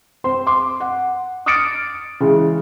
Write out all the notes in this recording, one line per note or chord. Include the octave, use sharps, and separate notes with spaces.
C4 C5 C6
C6 D6
F#5
D6 D#6 F6 A6 C#7 D7
C#3 E3 G#3